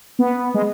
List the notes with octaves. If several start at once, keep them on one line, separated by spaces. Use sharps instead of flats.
B3
G#3